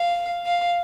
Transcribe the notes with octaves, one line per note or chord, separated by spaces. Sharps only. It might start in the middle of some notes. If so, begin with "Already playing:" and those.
Already playing: F5
F5